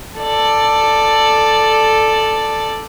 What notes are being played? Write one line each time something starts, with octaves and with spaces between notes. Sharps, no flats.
A4 D5